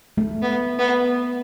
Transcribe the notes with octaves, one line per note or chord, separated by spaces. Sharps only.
A3
B3
B3